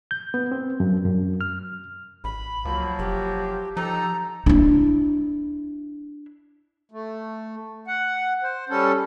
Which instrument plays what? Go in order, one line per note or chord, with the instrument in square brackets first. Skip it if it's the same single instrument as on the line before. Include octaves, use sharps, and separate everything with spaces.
[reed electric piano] G6
B3
C4
F#2
F#2
F6
[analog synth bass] A1 [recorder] B5
[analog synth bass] C#2 [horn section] F3 F#3 A#3
[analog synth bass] F1 [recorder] G4
[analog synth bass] F3 [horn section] D#4 G4 A4 [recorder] A#5
[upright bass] D4 E4
[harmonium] A3
F#5
C5
G3 C#4 A4